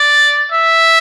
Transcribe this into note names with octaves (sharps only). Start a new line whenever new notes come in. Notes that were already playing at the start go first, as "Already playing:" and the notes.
Already playing: D5
E5